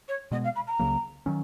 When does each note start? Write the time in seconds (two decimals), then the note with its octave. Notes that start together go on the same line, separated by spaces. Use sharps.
0.08 C#5
0.31 B2 G#3 B3 D#5
0.44 F5
0.56 B5
0.67 A#5
0.79 C#2 C#3 F#3 A#3
1.26 D#3 F#3 C#4